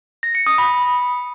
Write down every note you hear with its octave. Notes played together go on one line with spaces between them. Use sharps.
A#6
C#7
D#6
B5